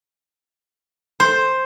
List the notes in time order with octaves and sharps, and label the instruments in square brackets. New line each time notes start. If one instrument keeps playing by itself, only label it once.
[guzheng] C5